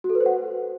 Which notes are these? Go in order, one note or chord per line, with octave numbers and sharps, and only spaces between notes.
F#4
A4
B4
C5
F#5